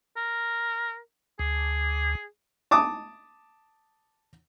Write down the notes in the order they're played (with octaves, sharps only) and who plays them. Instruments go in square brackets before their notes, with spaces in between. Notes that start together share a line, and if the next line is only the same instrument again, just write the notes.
[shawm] A#4
[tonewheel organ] D2 [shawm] G#4
[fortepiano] A5 D6 D#6